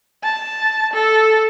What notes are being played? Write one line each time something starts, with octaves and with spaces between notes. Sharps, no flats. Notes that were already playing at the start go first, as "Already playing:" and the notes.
A5
A4